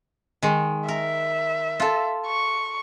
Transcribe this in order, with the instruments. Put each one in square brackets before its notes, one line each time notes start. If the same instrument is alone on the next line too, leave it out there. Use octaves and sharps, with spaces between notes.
[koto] D#3 G#3
[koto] A#4 [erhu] E5
[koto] F4 A4
[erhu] C#6